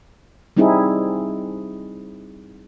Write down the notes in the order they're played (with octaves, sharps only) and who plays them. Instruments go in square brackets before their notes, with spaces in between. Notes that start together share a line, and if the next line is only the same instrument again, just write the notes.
[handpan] G3 C4 D#4 E4 G#4